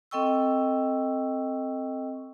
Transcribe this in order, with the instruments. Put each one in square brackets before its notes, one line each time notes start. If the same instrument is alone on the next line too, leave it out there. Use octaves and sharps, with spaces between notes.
[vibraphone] C4 A4 D#5 G5 C#6 E6